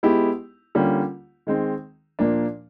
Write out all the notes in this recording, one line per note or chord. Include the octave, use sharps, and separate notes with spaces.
G#3 B3 E4 G4
D3 G3 A#3 C#4 F4
D#3 G#3 C4
A#2 F3 A#3 D4